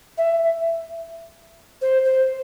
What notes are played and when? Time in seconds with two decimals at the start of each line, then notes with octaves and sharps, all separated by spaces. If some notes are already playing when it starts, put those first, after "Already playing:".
0.17 E5
1.81 C5
2.04 C5